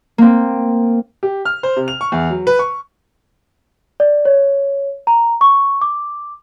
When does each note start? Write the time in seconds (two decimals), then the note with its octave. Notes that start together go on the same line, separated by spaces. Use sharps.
0.18 A#3 C4
1.23 G4
1.45 F6
1.63 C5
1.77 C3
1.88 F7
2.01 C#6
2.12 E2
2.30 F#3
2.47 B4
2.59 C#6
4.00 D5
4.25 C#5
5.07 A#5
5.41 C#6
5.82 D6